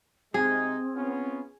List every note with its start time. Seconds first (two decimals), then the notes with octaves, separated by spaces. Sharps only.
0.34 C3 G#3 C4 D#4 G#4
0.95 B3 C#4 F4